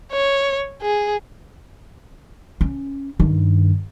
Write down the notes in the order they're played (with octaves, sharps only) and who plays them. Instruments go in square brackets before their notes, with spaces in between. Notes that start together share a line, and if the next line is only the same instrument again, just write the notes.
[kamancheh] C#5
G#4
[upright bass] C#4
G2 D#3